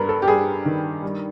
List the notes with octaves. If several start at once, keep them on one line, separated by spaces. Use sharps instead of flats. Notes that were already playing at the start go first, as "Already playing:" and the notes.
Already playing: G2 G3 A#4 B4
A4
G4
G2 G#4
D#3
G3